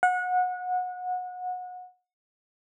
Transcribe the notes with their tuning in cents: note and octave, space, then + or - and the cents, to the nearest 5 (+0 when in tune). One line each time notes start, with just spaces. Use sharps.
F#5 -25